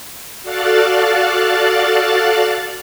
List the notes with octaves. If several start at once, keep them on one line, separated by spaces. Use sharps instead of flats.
F#4 A4 D5 F5 F#6 A6